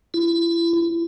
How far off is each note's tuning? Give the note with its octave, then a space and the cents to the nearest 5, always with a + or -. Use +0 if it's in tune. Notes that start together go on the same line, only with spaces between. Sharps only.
E4 +30